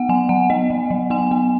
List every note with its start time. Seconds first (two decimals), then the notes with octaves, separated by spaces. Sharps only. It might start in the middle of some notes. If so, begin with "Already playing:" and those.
Already playing: B3 F#5
0.09 F#3 G#5
0.29 F#3 F#5
0.50 B3 D#5
0.70 F#3
0.90 F#3
1.10 B3 G#5
1.31 B3